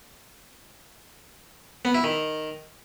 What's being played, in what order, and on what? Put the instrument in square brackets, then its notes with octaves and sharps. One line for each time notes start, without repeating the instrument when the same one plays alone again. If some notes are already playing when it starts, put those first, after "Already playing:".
[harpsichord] B3
E4
D#3